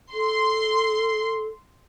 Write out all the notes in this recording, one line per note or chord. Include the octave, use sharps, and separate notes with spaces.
A4 C6